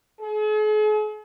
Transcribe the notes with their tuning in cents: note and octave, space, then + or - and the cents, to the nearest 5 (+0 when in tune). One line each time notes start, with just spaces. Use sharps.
G#4 +45